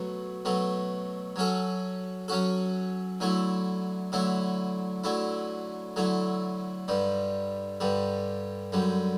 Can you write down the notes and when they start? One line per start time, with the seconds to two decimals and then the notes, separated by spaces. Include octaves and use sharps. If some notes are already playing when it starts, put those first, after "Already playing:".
Already playing: B2 F#3 A3
0.45 B2 F#3 A3
1.36 F#3 C#4 F#4 A4
2.28 F#3 C#4 F#4 A4
3.20 D3 F#3 A3 E4
4.12 D3 F#3 A3 E4
5.04 D3 F#3 A3 E4
5.96 D3 F#3 A3 E4
6.88 G2 D3 G3
7.80 G2 D3 G3
8.72 F#2 D3 G3